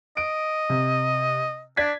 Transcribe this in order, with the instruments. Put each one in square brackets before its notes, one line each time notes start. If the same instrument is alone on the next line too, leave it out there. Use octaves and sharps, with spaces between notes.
[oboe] D#5 [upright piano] D7
[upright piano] C3
[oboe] D4 [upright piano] D5 G#6 B6